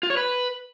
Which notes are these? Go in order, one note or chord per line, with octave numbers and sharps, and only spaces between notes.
F4
C#5
B4